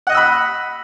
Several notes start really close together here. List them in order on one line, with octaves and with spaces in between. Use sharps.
F#5 D#5 F#6 E6 B5